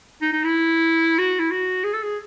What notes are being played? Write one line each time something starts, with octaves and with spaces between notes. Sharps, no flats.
D#4
D#4
E4
F#4
E4
F#4
G#4
A4
G#4